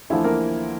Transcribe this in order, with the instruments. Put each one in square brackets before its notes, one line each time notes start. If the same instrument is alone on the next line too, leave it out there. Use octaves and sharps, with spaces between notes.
[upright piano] D2 D3 E3 F3 E4
A#3 A#4